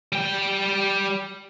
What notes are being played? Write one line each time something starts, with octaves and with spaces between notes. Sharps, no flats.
G3 G5